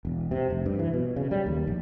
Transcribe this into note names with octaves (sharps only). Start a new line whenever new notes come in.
E1
C3
F1
G2
E3
B2
C#3
G3
D#2
A#1